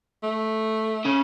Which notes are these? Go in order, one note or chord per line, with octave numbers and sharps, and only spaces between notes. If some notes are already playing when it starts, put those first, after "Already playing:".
A3
C#3 C#4